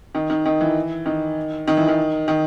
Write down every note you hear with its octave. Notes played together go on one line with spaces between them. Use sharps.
D#3
D#3
D#3
E3
D#3
D#3
E3
D#3
D#3